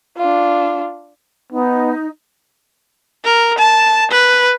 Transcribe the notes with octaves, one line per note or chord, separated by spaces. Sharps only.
D4 F4
B3 D#4
A#4
A5
B4